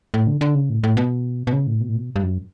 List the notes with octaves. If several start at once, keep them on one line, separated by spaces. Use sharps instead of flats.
A2
D3
D3
C#3
A2
A2
B2
B2
C#3
A2
B2
A2
B2
G2
F#2